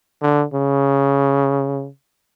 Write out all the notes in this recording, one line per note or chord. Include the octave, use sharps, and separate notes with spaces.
D3
C#3